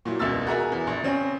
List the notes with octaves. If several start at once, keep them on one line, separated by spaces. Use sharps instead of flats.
A#2 F#3 E4
E1 C#2 B2 E5 E6 A6
F#4 G#4 A#4 E5 G#5 A#5
E2
A#1
C#3 C4 C#4